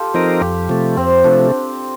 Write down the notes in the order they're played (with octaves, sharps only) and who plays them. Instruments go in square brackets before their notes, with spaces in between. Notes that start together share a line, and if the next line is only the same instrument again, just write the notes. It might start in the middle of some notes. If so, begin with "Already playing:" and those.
Already playing: [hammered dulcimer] F4 G4 A4
[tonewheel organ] F3 C4 D#4 A#4
[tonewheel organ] F2 [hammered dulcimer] G4
[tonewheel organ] C3 F3 A3
[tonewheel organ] F2 [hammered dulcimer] C4
[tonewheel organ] C3 F3 A3 [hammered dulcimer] D4